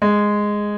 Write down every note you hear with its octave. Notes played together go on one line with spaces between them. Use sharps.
G#3